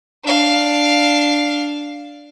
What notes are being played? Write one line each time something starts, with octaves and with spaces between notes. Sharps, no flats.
D4 F5